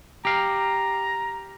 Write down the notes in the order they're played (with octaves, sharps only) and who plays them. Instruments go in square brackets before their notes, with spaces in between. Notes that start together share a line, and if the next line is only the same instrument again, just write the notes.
[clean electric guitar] G4 F5 [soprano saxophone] A#5